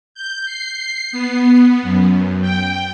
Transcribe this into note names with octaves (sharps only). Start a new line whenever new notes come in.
G6
C7
B3
F#2
G5